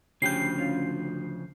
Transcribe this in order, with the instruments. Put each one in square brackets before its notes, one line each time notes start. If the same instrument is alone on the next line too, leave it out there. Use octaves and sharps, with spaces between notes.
[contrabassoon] D2 [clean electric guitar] C#3 F3 [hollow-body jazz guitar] C#4 G4 [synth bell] G6 C7
[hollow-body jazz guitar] C#4 F4